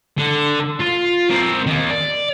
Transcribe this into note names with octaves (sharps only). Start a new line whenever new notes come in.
D3
F4
C4 A#4
D#3 A#3
D5